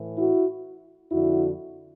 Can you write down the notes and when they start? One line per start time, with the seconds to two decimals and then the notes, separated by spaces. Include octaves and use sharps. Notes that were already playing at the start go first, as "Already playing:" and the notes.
Already playing: A2 E3
0.18 E4 F#4
1.10 F2 D3 E4 F#4